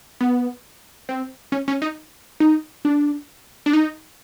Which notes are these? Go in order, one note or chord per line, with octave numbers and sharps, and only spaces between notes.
B3
C4
C#4
C#4
D#4
D#4
D4
D4
D#4